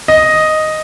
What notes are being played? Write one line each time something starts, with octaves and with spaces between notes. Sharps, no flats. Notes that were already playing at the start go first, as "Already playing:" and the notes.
D#5